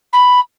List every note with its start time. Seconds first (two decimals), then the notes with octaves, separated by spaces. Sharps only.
0.13 B5